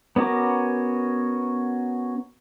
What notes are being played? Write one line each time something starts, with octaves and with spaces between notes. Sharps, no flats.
B3 C#4 F#4 A#4 D6